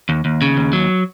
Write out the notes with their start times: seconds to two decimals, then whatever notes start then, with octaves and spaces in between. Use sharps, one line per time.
0.09 D#2
0.25 D#2
0.42 C#3
0.57 D#2
0.73 F#3